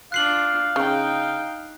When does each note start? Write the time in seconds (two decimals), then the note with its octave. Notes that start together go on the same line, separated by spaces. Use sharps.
0.12 D4 F4 F5 F#6 C7 F#7
0.76 C#3 D#4 G5